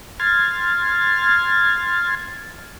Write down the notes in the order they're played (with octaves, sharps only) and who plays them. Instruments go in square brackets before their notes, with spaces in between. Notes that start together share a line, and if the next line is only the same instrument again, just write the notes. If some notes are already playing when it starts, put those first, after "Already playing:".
[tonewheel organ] C6 F6 G#6 A6